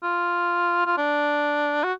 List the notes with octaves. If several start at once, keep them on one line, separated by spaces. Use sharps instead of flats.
F4
F4
D4
F#4